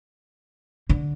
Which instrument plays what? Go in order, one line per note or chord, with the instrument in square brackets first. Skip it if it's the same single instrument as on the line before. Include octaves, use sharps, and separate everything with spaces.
[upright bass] D3